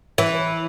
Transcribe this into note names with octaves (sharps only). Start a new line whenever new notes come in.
E3